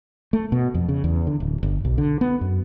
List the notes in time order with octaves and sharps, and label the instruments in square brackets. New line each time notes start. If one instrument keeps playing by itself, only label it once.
[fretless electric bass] A3
B2
F2
C#3
E2
D3
D1
G1
B1
D3
B3
F#2